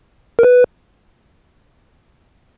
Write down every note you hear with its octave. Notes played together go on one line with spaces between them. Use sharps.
A#4
B4